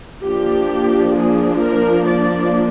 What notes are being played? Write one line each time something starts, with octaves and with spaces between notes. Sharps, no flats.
F3 A#3 D4 G4
G#4
A#4
D5